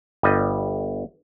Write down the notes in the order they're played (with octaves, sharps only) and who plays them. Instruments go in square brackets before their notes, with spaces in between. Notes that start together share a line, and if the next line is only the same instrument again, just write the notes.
[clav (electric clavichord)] G1 G3 D#5